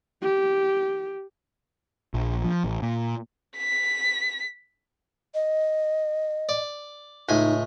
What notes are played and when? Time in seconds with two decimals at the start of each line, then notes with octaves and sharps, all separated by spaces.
0.22 G4
2.14 A#1
2.45 F3
2.64 A1
2.82 A#2
3.57 B6
5.34 D#5
6.49 D5
7.29 C#2 A2 D#4 G#5